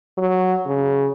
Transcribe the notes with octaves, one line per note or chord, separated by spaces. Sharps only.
F#3
C#3